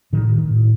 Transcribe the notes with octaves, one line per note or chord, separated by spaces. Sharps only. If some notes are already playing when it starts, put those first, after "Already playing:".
A2 D#3
A2